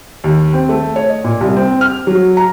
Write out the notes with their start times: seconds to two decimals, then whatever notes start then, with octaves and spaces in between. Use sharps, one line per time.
0.24 D#2
0.53 C4
0.69 A3
0.96 C#5
1.09 D#5
1.24 A#2
1.41 C2
1.56 C4
1.81 F6
2.07 F#3
2.37 A#5